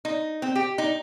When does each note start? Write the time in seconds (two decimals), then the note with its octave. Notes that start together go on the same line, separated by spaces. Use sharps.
0.05 D#4
0.42 C4
0.56 G4
0.78 D#4